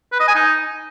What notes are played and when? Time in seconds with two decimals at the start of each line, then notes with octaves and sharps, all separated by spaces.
0.12 B4
0.20 D#5
0.28 G#5
0.35 D#4